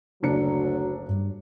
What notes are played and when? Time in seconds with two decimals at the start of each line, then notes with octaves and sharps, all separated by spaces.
0.23 F#1 D2 F#3 D4 C#7
1.08 G2